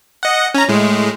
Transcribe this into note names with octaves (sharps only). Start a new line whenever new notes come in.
D#5 F#5
C#4 A#5
A2 G#3